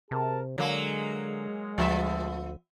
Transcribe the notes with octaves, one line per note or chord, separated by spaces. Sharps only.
C3 G#4 A#4 A5
D3 F#3 G#3 A#3
D2 F3 B3 E5